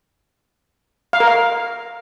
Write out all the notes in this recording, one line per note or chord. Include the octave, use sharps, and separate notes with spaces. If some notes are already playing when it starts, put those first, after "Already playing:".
F5
A#4
F5